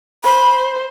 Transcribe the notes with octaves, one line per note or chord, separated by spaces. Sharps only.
C5 B5